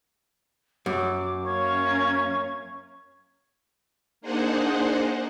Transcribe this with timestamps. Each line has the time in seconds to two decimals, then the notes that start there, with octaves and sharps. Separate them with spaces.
0.86 F#2 D6
1.46 A#3 C#4 C#5 G#6
4.21 A#3 D4 D#4 G#4 C5 F#5